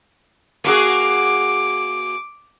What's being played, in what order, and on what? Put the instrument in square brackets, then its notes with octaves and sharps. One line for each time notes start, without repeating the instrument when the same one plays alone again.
[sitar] A#3 F#4 G#4 [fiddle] D6